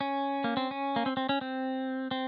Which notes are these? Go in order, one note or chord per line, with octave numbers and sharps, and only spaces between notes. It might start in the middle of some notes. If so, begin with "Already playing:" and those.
C#4
A#3
C4
C#4
A#3
C4
C4
C#4
C4
C4